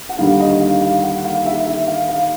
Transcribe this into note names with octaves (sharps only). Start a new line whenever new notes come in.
F#5
D#2 D3 G3 F5
D#5
F5
F5
F#5
F5
E5
E5
F5
F5